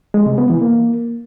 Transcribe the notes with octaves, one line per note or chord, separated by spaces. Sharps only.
G#3
C3
B3
E3
A#3